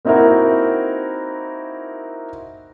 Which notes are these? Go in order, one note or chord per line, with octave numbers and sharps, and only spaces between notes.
A#3 C4 D#4 E4 F#4 A#4